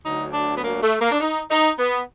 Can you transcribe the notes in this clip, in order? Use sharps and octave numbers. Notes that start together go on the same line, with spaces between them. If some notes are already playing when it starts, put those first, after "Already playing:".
D2 D3 F#3 D#4
D4
B3
A#3
A3
A#3
D4
D#4
D#4
B3